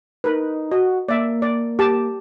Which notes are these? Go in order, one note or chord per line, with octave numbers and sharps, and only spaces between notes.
D#4 A#4 B4
F#4 D#5
A#3 D5 E5
D5
G4 A5